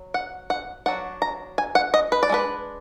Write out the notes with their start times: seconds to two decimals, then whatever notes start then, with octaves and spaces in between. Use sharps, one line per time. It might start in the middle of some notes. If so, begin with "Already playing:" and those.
Already playing: F#3
0.14 F#5
0.50 F#5
0.86 F#3 D4 F#5
1.22 A#5
1.58 G#5
1.75 F#5
1.94 D#5
2.12 B4
2.23 D5
2.30 G#3 D4 B4